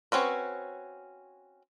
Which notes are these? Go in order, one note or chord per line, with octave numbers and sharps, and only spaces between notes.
C4 C#4 F#4 B4